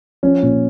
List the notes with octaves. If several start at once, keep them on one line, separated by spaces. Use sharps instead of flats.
F3 C#4
A#2